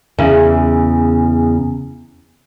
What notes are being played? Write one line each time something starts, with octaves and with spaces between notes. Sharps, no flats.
E2 C#3